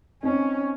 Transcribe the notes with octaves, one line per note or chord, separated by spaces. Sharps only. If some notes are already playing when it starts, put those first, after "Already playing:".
C4 C#4 D#4